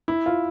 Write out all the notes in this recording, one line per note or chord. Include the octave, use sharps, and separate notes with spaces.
E4
F4